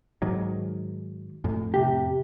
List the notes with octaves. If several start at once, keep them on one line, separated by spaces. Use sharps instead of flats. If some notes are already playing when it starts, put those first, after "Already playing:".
G#2 D#3 F#3
F2 A2
C3 G4